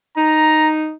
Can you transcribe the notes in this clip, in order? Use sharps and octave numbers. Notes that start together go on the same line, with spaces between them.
D#4 A#5